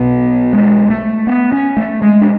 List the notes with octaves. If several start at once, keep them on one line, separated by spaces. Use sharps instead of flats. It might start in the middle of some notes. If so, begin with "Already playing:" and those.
Already playing: B1 B2 B3
G#3
A3
B3
C#4
A3
G#3
D4